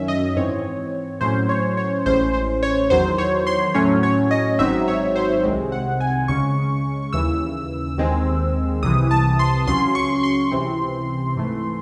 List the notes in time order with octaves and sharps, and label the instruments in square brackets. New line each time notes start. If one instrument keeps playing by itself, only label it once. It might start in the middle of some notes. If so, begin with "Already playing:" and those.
Already playing: [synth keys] F#2 D#3 F#3 C#4 E5
D#5
G#2 E3 C4 C#5
A2 F#3 C#4 C5
C#5
C#5
A1 A2 G#3 C#4 C5
C5
C#5
E2 D#3 F#3 C5
C#5
C6
A2 F#3 A3 C#4 C#5
C#5
D#5
G#1 G#2 F#3 C4 D#4 E5
C#5
C5
C2 C3 D#3 G#3 C4
F#5
G#5
C#2 C#3 G#3 C#4 C#6
D#2 C#3 E3 E6
D#2 D#3 G#3 C4
C2 C3 E3 D#6
A5
C6
C#2 C#3 F#3 C#4 C6
C#6
C6
C#2 C3 E3 C4
G#2 E3 A3